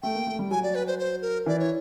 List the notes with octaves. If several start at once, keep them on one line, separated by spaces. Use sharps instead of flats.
A3 G5
A#3
A3
G3
F#3 G#5
D5
B4
C5
C5
A#4
E3 D5
C#5